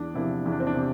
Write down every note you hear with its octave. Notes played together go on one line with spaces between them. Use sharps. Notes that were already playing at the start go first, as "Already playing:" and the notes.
Already playing: E2 D4
C3 F3 E4
E2 E4
D4
C4
D4
C3